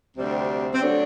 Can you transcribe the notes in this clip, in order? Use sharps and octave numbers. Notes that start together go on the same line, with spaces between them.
D2 C3 G3 C4
C4
D3 F#3 A3 D4